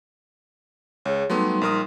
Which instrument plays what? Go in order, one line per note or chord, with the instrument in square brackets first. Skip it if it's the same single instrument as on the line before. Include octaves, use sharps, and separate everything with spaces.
[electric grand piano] C#2 [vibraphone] G#4 C#5
[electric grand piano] F#3 A3 B3 [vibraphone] G3 D#4 C6
[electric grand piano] A#1 A#4 D#6